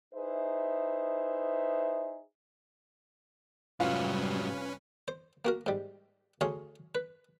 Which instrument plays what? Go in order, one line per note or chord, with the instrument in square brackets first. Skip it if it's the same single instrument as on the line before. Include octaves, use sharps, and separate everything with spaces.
[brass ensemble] D#4 E4 G#4 B4 C5 E5
[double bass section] F1 C3 G3 [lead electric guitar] G#2 F#3 [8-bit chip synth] C#4 B4 [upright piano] F4
[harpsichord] C5
A#3 F#4 A#4
G#2 G3
D2 G#4 C#5 F5 C6
B4